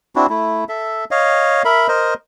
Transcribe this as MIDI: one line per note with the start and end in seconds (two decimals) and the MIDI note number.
0.16 0.27 60
0.16 0.27 62
0.16 0.27 64
0.16 0.27 66
0.29 0.64 57
0.29 0.64 64
0.69 1.05 69
0.69 1.05 76
1.11 1.63 73
1.11 1.63 75
1.11 1.63 77
1.65 1.88 70
1.65 1.88 76
1.65 1.88 83
1.88 2.14 70
1.88 2.14 72
1.88 2.14 75